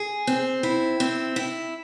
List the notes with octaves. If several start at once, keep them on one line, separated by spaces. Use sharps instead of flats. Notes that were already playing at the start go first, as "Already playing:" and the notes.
Already playing: G#4
C4
E4
C4
E4